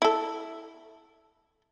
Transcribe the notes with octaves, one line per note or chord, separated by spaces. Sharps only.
E4 A4